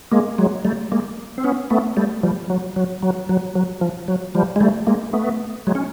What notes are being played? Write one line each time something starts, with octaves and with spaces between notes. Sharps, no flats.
G#3 A#3
F#3 G#3
G3 A3
G#3 A#3
C4
B3 C#4
A3 B3
G3 A3
F3 G3
F#3
F#3
F#3
F#3
F#3
F3
F#3
F3 G3
G#3
G3 A3
G#3 A#3
A3 B3
F#3 G#3
C#4